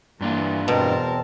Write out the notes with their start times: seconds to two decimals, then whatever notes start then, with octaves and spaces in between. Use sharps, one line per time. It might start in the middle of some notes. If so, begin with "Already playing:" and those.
0.21 G2 E3 A#3 D4 F4
0.68 E2 B2 C4 A#4 A5